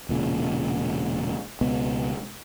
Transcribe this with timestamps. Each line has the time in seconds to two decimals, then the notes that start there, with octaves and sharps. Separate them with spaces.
0.09 E1 A#2 C#3
1.61 C#2 B2 B3